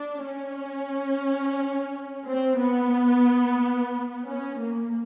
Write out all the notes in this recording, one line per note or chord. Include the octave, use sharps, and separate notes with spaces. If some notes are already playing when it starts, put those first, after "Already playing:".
Already playing: D4
C#4
C4
B3
C#4
A#3